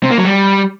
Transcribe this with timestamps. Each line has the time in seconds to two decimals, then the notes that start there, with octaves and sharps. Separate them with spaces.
0.03 C3
0.11 A#3
0.18 F#3
0.25 G3